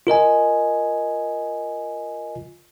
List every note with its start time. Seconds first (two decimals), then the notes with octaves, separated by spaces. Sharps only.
0.07 F4 A#4 D#5 G#5